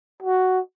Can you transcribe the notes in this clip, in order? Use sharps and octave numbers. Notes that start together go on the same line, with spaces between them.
F#4